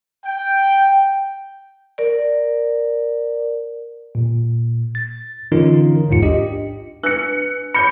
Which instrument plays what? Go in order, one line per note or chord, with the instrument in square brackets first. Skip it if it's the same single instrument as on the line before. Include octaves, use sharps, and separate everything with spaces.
[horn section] G5
[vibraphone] A#4 D5
[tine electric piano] A#2
A6
D3 E3 C#4 D#4 F4 A#4
A1 D#2 G#2 F4 C#7
D4 G4 D#5
[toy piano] D4 B4 E6 [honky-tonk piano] F#6 C#7
[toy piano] C#5 B5 [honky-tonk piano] G6 C#7